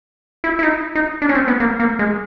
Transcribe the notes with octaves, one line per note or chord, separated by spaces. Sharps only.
E4
E4
D#4
D#4
D4
C#4
C4
B3
A#3
A#3
G#3